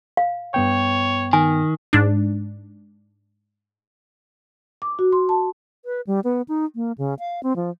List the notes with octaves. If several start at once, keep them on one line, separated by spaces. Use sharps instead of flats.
F5
G2 B3 C#5 G5
D#3 G#5
G#2 D4
D6
F#4
C6
A5
B4
G3
B3
D#4
A#3
C#3
F5
C4
F3